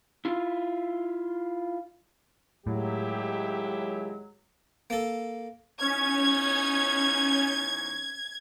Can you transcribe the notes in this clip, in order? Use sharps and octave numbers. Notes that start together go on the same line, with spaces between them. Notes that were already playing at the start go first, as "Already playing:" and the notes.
E4 F4
D#2 A2 F#3 G#3 E4 G4
A#3 A4
E2 C#4 D#4 C#5 G#6